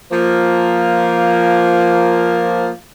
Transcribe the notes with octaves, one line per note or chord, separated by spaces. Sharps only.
F3 A#3